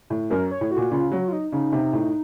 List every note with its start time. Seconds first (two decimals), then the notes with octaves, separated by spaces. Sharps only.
0.10 A2
0.30 F#2 A#4
0.51 C#5
0.61 A2
0.71 F#4
0.77 A#2
0.91 C#3 F4
1.12 F#3 F#4
1.28 F4
1.33 D#4
1.52 C#3 D#4
1.72 C3
1.93 A2